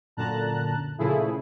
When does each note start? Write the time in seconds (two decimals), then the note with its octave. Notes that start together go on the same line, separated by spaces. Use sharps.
0.17 F#2 A#2 D3 A5 A#5 F#6
0.98 A#2 C#3 F3 A3 E4 G#4